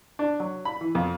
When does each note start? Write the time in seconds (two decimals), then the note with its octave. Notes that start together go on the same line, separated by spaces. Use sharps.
0.19 D4
0.40 F#3
0.65 B5
0.81 E3
0.95 F2